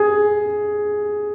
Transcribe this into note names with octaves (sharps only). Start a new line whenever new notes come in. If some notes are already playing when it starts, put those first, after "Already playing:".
Already playing: G#4